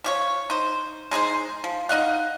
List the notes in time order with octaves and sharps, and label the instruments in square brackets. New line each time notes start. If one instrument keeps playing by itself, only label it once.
[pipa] F3 G4 C#5
D#4 C5
G#3 D#4 G#4 C5
F3
D#4 D#5 F5 F#5